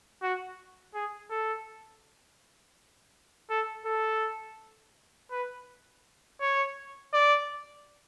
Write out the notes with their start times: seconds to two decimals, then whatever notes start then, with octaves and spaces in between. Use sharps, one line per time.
0.23 F#4
0.94 G#4
1.31 A4
3.50 A4
3.86 A4
5.32 B4
6.41 C#5
7.14 D5